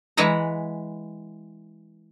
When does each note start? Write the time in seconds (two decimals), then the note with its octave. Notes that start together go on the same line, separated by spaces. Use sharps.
0.17 E3 G#3 B4 F#5 A#5